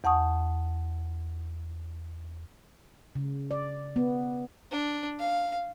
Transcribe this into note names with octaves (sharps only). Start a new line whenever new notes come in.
E2 F#5 A5 C#6 D#6
C#3
D5
B3
D4
F5